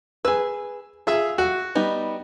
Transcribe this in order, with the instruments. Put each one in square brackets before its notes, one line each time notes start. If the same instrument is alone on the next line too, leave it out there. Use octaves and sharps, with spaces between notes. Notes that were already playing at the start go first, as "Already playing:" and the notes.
[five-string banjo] G#4 B4 [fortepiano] E6
[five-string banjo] F4 [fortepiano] G#4 E5 E6
[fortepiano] F#4
[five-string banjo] G3 B3 D#4